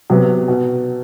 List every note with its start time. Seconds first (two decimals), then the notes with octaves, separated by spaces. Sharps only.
0.10 C3 F#3 B3
0.48 B2